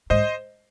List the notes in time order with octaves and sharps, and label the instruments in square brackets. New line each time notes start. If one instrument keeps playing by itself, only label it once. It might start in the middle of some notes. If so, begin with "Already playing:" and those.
[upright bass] G#2 [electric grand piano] C5 D#5